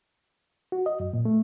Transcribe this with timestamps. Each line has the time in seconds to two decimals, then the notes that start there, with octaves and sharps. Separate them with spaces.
0.72 F#4
0.86 D#5
1.00 F#2
1.13 A#2
1.25 A3